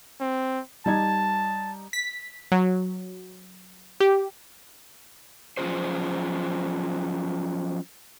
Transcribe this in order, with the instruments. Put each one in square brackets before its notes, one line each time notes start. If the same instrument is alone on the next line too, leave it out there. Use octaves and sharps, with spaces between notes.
[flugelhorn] C4
[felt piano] G3 D#4 G#6 [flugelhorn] A5
[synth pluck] B6
F#3
G4
[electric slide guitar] F3 F#3 C#4 F4 G#4 C5